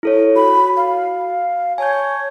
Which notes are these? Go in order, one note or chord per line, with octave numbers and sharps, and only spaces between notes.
E4 A4 C#5
F#4 B5
F5
C#5 G#5 A5 G6